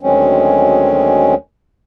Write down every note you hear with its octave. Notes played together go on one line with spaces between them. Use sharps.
D2 D#3 F#3 G#3 C4 C#4